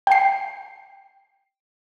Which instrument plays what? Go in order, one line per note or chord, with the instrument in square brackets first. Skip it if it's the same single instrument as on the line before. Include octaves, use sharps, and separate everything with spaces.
[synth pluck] G5 C7